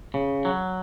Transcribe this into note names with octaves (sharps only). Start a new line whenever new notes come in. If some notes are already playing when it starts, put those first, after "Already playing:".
C#3
F#3